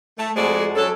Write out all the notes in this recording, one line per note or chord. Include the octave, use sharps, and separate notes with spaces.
A3
F2 G#3 F#4 C5 D5
F#3 C#4 A4